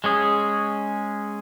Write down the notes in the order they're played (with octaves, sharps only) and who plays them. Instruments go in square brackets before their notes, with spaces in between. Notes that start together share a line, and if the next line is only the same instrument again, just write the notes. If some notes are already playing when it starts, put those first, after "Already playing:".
[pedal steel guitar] G#3 C#4 G#4